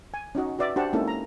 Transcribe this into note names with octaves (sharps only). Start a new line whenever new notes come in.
G#5
C#4 D#4 F#4 D#5
F#4 B4 D5 E5
D4 F#4 G4 C5 F#5 A5
G#3 A#3 C#4 D#4 E4 A4
A#5